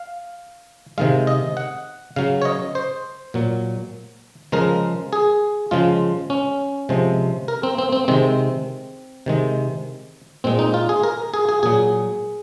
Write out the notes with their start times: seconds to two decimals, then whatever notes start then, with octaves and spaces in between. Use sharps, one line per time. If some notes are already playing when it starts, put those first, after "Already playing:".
Already playing: F5
0.98 C3 D#3 G#3 F5
1.27 D#5
1.57 F#5
2.16 C#3 F#3 F5
2.42 C#5
2.45 D#5
2.75 C5
3.34 A#2 F#3
4.52 C#3 F3 G#3 A#4
5.13 G#4
5.71 C#3 F3 G#3 F4
6.30 C#4
6.89 C3 F3 G#3
7.48 A#4
7.63 C4
7.78 C4
7.92 C4
8.08 C3 D#3 G#3 C4
9.26 C3 D#3 G#3
10.44 A#2 G#3 C4
10.59 D#4
10.74 F4
10.89 G#4
11.03 A#4
11.34 G#4
11.49 G#4
11.63 A#2 F#3 G#4